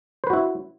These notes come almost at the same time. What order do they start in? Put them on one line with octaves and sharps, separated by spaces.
C5 B4 F#4 E4